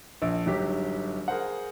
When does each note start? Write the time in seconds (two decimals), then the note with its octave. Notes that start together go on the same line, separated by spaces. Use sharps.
0.22 A#1
0.46 G1 G#2 F#3 G4 B6
1.28 G#4 A#4 C5 F#5